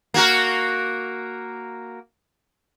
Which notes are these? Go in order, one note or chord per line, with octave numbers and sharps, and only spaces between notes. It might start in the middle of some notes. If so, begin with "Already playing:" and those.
A#3 F#4 A#4